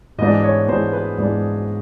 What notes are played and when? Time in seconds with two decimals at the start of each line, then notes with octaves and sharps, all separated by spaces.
0.18 G#2 E3 G#3 B3 D4 D#5
0.44 C#5
0.68 G#2 E3 G#3 B3 D4 C5
0.93 B4
1.18 G#2 E3 G#3 B3 D4